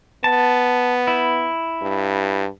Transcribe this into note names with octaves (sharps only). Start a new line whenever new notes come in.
B3 A5
E4
G2